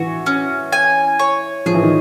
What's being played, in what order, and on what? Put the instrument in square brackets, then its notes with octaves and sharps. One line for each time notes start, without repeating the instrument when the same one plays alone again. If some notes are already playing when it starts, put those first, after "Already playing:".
Already playing: [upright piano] E3 [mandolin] F#4
[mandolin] C#4
G#5
C#5
[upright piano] F3 [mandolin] G#4
[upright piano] E3
D#3